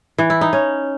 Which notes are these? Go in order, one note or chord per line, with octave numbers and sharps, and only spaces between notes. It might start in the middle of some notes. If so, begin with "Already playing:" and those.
E3
E4
D#4
C#4